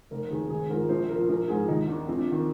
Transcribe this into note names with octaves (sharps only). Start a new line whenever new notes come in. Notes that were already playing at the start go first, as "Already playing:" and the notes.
F1 A#4
D#2 D#3 G#4
G#1 G#4
G#2 F3 A#4
A#1 C5
A#2 F3 A#4
A#1 A#4
G#2 F3 G#4
D#2 D#4
D#3 D4
A#1 C4
D4
F4
D#3
D4